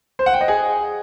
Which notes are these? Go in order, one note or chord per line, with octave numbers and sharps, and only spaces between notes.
C5
F#5
G5
D#5
G#4